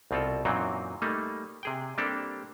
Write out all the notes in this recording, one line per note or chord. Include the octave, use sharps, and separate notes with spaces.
C2 B2 C4 F4 A4
F#2 A#2 E3 F#3 C4 D#4
G3 A3 A#3 D#4
C3 G#4 G5
G3 A#3 C4 D4 G4 A4